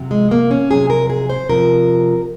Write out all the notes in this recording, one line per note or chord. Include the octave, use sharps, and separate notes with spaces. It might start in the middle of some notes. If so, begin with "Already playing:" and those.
Already playing: F2 C3 F#3
G#3
A#3
C#4
F2 C3 F#3 G#4
A#4
G#4
C5
F2 C3 F3 A#4